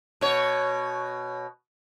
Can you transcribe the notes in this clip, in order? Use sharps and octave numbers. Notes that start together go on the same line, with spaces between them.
B2 C#5